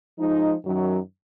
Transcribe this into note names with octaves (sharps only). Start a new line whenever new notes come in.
F3 G#3 D#4
F#2 D#3 F#3